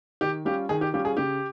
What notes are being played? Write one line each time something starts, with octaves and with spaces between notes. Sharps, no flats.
D#3 G4
G3 C#4 F4 G4
D#3 G#4
G4
G3 C#4 F4 G4
G#4
C#3 G4